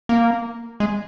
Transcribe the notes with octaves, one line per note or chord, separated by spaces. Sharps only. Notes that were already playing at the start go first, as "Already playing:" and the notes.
A#3
G#3